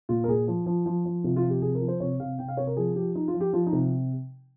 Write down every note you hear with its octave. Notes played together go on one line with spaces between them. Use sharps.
A#2 F4
A#4
A#2 G#4
F3
F3
F3
F3
C3 F4
F4
F3
G4
C3 G#4
A#4
F3
C5
C3 C#5
C3 F5
C3 G5
F5
C3 C#5
A#4
F3 G#4
F3 G4
F3 D#4
F4
F3
G4
F3 F4
D#4
C3